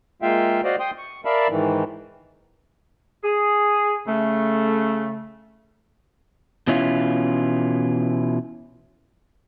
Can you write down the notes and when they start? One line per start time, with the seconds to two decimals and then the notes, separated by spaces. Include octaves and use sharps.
0.22 G#3 A#3 F4 E5 F5 G5
0.64 F#4 C5 D5 D#5 F5
0.80 G5 C6 D#6
0.98 C#6
1.25 A#4 D5 E5 F5 A5 B5
1.50 G#2 D#3 E3
3.24 G#4
4.07 C#3 A3
6.67 B2 E3 C#4 E4 F4